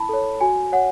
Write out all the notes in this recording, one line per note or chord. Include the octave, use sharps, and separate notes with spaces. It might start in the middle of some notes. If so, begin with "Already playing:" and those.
Already playing: E4 A5 B5
A4 C#5
F#4 G#5
C#5 F#5